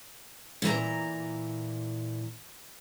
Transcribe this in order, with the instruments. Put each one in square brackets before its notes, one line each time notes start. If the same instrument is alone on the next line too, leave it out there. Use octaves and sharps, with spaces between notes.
[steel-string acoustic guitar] A#2 E3 B4 A#5